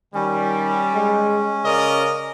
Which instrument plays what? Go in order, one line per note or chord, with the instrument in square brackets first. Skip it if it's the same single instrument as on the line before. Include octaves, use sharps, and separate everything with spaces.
[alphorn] D#3 [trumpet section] G3 [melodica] C#4
[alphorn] G#3
[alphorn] C#3 [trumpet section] A#4 D5 D#5